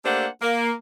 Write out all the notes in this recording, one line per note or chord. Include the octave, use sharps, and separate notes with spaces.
A3 A#3 D4 G4 C5 F#5
A#3